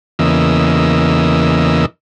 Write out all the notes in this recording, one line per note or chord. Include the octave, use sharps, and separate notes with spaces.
E2 C#3 E3 A#3 D#5 E6